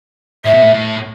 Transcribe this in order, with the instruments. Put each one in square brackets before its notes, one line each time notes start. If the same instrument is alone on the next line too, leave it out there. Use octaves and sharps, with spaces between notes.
[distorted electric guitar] A2 [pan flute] E5
[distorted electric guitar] B2
A2
A2